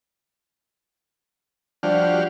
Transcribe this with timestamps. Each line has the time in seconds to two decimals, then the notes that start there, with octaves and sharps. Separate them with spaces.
1.83 F3 G3 D4 F#4 G4 D5 F5